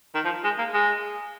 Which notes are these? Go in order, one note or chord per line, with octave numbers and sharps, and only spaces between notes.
D#3
F3
G#3
A#3
G#3